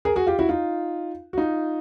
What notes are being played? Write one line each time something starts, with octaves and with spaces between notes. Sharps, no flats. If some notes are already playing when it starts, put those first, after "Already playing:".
G#4 A#4
F#4 G#4
F4 G4
E4 F#4
D#4 F4
F#4
D#4 F4